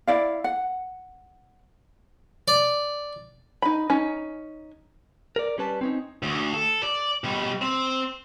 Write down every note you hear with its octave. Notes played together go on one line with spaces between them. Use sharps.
E4 D5 F5
F#5
D5
D#4 B5
C#4 D#4
A#4 D5
G3 C#4 B4 A5
C4 C#4 D#4
D2
A4
D5
B2 G3
C4